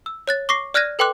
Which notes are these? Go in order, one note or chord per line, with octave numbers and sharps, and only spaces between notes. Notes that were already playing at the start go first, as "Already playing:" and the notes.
E6
C#5 F#6 A6
C#6 D6 A#6 C7
D5 F6 F#6 G#6 A#6 D#7
A4 B4 G5 C6 D6 F#6